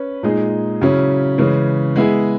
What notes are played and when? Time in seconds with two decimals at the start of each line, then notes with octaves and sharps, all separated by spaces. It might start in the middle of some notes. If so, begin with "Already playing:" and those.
Already playing: C#4 B4
0.23 A#2 G#3 D#4 G#4
0.81 C#3 F#3 C#4 E4
1.38 C#3 E3 G#3 C#4
1.96 G#3 B3 E4 G#4